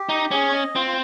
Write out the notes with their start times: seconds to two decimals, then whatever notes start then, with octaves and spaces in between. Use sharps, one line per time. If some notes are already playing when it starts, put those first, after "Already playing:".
Already playing: G4
0.09 D#4
0.31 C#4 G#4
0.48 C#5
0.53 D#5
0.75 C4 F4
0.87 F4